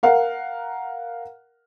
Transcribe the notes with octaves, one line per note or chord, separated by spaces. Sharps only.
A#4 F5 F#5